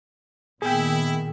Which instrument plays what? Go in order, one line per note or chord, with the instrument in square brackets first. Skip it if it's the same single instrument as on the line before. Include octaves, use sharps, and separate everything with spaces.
[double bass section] A#2 D#3 [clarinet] B3 [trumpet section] E4 [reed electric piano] G#4 G5